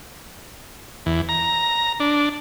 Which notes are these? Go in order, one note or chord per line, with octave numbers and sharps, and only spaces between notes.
E2
A#5
D4